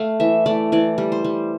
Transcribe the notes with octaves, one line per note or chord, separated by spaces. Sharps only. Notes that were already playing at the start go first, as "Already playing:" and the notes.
Already playing: A3 F5
E3 E5
A3 D5
E3 D5
G3
C5
G3